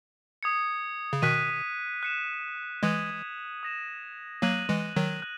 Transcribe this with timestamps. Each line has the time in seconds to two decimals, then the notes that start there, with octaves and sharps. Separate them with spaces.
0.43 D#6 G#6 C#7
1.13 C#3
1.22 B2 D#3 F#6 B6 D#7
2.03 F#6 C#7 E7
2.83 E3 G#3 D#6 G#6 D#7 F#7
3.63 D#6 A#6 E7
4.42 F#3 A#3 F#6 A#6 D#7 F#7
4.69 E3 G#3
4.96 D#3 F#3
5.22 F#6